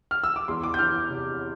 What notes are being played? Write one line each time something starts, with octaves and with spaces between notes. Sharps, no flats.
F6
E6
D6
E2 C6
D6
G6
E3 F6
C3